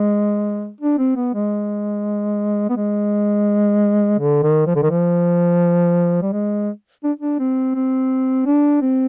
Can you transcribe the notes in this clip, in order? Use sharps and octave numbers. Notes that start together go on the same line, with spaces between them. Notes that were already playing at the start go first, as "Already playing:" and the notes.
Already playing: G#3
D4
C4
B3
G#3
B3
G#3
D3
D#3
F3
D3
D#3
F3
G3
G#3
D4
D4
C4
C4
D4
C4